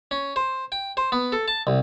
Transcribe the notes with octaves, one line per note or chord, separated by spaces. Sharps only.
C#4
C5
G5
C5
B3
A4
A5
C2